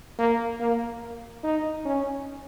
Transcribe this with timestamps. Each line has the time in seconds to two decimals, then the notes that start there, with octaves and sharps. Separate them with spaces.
0.19 A#3
0.61 A#3
1.44 D#4
1.85 C#4